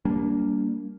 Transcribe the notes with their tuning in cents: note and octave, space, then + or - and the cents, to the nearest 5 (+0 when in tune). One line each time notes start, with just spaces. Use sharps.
G3 +0 A#3 +0 D4 -30